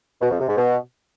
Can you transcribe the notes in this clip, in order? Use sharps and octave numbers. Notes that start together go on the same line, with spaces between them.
B2
F2
C3
G#2
B2